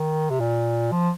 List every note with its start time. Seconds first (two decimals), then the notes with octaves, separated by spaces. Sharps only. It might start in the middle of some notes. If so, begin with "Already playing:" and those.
Already playing: D#3
0.30 C3
0.40 A#2
0.92 F3